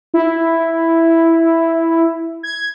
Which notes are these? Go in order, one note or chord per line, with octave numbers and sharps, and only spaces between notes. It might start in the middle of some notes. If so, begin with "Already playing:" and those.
E4
G#6